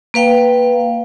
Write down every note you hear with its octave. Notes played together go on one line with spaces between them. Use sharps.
A#3 B4 F5 G5